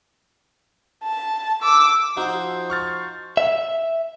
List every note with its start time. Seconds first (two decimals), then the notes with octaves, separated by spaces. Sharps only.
1.04 A5
1.62 D6 E6
2.17 F3 D#4 F#4 C5
2.70 C5 C#6 F6 A6
3.37 E5